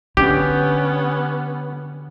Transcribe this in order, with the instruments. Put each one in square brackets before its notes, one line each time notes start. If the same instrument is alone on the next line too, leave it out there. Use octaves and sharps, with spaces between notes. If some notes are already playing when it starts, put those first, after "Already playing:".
[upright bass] D3 [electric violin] B3 C#4 [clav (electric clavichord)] G4